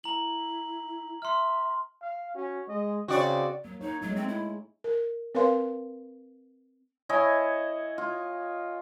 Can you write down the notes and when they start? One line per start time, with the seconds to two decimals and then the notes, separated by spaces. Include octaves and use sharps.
0.04 E4 A#5 F#7
1.22 E5 C6 F6
2.02 F5
2.35 C#4 F#4
2.68 G#3 D#5
3.08 C#3 C4 F#4 D5
3.65 F#3 A#3
3.81 D#4 C#5
4.02 F#3 G#3 A3 D#4
4.16 C4
4.28 E4
4.84 A#4
5.35 C4 A#4 B4 C#5 F5 C6
7.09 E4 C#5 D#5 G#5
7.98 F4